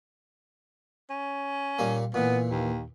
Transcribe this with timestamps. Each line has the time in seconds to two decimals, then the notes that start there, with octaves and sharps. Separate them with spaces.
1.10 C#4
1.79 A#2 G3 A#3
2.14 A#2 E3 B3
2.50 D#2